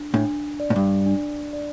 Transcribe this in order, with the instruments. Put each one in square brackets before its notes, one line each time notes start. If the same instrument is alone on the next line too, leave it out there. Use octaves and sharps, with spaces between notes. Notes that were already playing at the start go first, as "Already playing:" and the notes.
Already playing: [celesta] D4
[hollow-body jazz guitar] A2 [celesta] D4
[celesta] D5
[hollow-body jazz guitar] A2
G2
[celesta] D4
D5